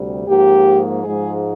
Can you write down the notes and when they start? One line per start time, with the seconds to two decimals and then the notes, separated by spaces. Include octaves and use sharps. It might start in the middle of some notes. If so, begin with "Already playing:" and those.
Already playing: D2 C3 G3
0.27 G#2 F3 A#3 G4
1.03 G#2 F3 G#3 G#4